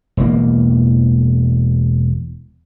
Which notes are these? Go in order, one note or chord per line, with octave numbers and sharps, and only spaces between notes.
E1 E3 A#3